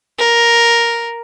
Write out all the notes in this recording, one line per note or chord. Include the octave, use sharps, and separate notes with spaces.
A#4